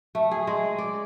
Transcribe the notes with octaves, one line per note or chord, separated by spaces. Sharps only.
A3
G#4
G#3
D5